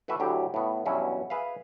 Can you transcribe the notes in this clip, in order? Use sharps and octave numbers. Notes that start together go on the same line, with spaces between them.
E3 A3 F#4 B4 E5
D2 A2 F#3 E4 G4
A2 B3
E2 G2 B2 F#3 C#4 E4
G#4 B4 E5 F5